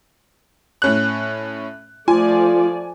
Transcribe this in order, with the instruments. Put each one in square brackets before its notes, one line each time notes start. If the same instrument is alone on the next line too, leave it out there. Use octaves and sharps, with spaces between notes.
[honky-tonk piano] A2 C#4 F#6
[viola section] F3 A3 D5 [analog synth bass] F4 [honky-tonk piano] G#5